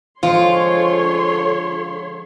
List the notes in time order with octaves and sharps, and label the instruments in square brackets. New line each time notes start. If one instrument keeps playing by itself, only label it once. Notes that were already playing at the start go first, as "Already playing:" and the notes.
[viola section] D3 C#5 C6 [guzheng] F3 G#3 [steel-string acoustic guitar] F4